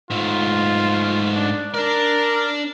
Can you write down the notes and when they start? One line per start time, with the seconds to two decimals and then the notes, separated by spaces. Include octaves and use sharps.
0.10 G#2 A3 F4
1.35 D4
1.74 D4 A#4 D5